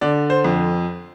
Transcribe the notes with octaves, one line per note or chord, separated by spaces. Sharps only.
D3 D5
C5
F2